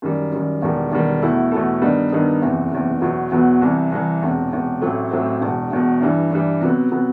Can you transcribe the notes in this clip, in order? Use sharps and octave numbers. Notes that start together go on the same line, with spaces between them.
F#2 D#3 G3
F#2 D#3 G3
E1 E2 D#3 G3
E1 E2 D#3 G3
E2 B2 A3 E4 A4
E2 B2 A3 E4 A4
G2 D#3 G3 B3 D#4
G2 D#3 G3 B3 D#4
F#1 E2 C3 E3
F#1 E2 C3 E3
E2 B2 F#3 B3
E2 B2 F#3 B3
C2 C3 E3
C2 C3 E3
E1 E2 C3
E1 E2 C3
A1 A2 F#3 A3 C4
A1 A2 F#3 A3 C4
E1 E2 B2
E1 E2 B2
G2 E3 G3
G2 E3 G3
C3 F#3 B3
C3 F#3 B3